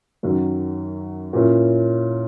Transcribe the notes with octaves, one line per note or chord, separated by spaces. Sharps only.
F#2 D#3 F#3
A#2 A#3 C#4 E4